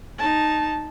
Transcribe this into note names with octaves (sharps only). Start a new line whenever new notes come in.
D#4 A5